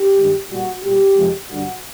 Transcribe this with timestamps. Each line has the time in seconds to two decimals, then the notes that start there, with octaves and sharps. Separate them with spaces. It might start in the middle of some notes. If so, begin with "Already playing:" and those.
Already playing: G4
0.16 G2 D#3 G#3
0.49 A#2 G3 F#4
0.82 A#2 G3 G4
1.15 F2 C3 F3 G#3
1.49 G2 D3 G3 F#4